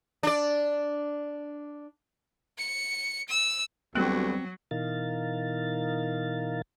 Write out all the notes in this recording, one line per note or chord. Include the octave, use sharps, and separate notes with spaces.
D4 D5
C#7
E6
D2 F#3 G3 B3 C4 F#6
B2 E3 D#4 A#4 F5 A6